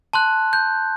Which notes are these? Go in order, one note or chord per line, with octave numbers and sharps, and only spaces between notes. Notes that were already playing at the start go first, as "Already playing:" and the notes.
A5 C6 F#6
G6